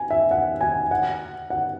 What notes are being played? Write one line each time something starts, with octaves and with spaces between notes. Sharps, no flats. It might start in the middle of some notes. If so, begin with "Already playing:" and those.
Already playing: G#5
E5
F#5
G#5
F#5
F#5